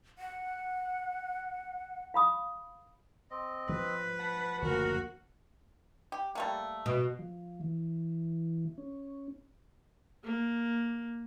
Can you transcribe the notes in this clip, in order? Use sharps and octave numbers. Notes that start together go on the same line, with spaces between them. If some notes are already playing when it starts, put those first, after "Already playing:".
F#5
F5 B5 D#6
C4 D#5
F3 B4
F#5 A5 B5
F#1 D2 F3 A#3 F#4 A#4
G4
G3 A3 A#3
B2
F3
E3
C#4
A#3